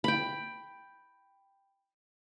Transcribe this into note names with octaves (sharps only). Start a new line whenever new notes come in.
G5 B5